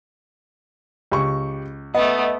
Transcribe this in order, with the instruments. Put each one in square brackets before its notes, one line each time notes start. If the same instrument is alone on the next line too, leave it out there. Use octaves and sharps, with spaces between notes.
[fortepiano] C#2 [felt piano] G4 C#6
[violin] A3 B3 [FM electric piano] D#5 [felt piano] F#5